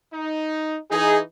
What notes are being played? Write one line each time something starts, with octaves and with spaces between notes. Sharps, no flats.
D#4
E3 D#4 G#4